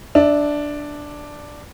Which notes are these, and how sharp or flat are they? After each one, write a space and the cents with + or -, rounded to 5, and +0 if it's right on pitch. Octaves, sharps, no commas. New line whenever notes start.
D4 +0 E5 -20